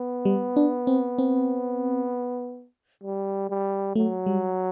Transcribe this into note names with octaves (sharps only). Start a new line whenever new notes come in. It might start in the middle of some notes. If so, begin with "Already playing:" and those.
Already playing: B3
G3
D4
C4
C4
G3
G3
F#3 A3
G3